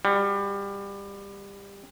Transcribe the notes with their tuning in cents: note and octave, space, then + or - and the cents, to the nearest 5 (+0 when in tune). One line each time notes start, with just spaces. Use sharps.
G3 +25 F#4 +10